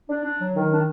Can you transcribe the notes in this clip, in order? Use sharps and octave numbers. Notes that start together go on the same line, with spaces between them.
D4
D4
F#3
D#3
D4